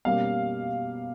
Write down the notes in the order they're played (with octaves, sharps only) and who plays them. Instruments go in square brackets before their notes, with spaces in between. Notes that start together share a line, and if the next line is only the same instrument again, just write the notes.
[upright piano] B2 G3 A#3 C#4 F5